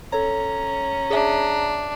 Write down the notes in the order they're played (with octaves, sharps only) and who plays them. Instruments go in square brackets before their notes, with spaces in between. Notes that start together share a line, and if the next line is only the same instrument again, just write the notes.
[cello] C#4 [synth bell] A4 C#5 [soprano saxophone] A#5
[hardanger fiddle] D4 [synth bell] G#4 E5